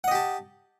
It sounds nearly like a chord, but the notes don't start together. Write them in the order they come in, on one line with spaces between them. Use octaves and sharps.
F#5 D#5 G4 A5